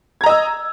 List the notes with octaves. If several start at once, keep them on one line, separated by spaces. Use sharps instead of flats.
D#5 A#5 E6 G#6